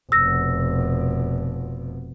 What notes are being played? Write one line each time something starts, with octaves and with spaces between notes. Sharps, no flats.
F1 B2 E6 A#6